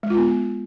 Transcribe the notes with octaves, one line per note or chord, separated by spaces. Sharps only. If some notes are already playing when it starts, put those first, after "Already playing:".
G#3
F4
B3